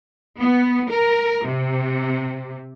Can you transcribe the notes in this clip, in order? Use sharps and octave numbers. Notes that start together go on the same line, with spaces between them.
B3
A#4
C3